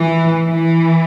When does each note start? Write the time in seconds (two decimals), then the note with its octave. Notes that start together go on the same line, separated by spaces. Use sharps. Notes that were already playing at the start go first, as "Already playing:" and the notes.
Already playing: E3
0.48 E3